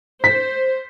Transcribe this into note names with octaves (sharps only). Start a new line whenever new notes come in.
C5 B6